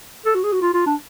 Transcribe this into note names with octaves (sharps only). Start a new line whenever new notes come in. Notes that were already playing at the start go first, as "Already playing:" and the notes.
A4
F#4
G#4
F#4
F4
F4
D4